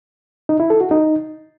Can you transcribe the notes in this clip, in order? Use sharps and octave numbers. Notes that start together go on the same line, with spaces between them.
D#4
E4
A4
F#4
D#4